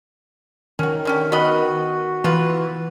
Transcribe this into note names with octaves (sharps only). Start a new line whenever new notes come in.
D#3 C#4 F#4
D3 C#4 G4
B3 F#4 D#5 B5
E3 B3 F4 B4